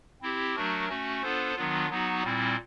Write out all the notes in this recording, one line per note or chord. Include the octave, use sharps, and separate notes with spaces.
C4 E4 G4
F#3 A3 D4 F#4 A#4
A3 C#4 F#4
B3 D4 F4 A4 C5
D#3 F#3 B3 D4 F4
F#3 B3 D#4 F#4
A#2 G3 C4 E4